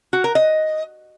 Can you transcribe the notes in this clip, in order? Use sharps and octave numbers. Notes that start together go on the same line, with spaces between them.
F#4
A#4
D#5